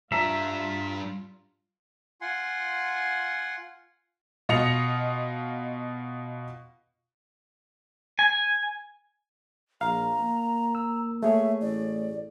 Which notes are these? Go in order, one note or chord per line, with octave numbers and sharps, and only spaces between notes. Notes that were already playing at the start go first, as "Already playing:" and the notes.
G3 D4 F4 E5 A#5
F4 F#5 G#5 C6
B2 F4 D#5 A#6 C#7 F7
G#5
A#1 F5 A#5
A#3
E6
A3 G#4 C#5 E5
A1 D5